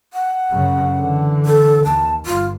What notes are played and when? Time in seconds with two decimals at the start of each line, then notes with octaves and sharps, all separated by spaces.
0.13 F#5
0.51 F#2 C#3
0.97 D3 E3
1.46 A4
1.85 D#2 A5
2.26 G1 F4